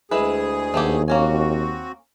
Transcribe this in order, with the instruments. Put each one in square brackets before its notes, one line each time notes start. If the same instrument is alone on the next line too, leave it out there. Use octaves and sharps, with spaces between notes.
[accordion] D2 G#4 [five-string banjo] G#3 E4 B4
[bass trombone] D#2 [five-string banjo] A3 B3 G4
[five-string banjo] A#3 C#4 G#5 [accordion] C4 F#4